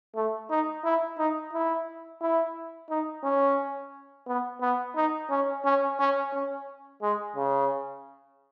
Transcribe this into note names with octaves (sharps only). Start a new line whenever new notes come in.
A3
D#4
E4
D#4
E4
E4
D#4
C#4
B3
B3
D#4
C#4
C#4
C#4
C#4
G#3
C#3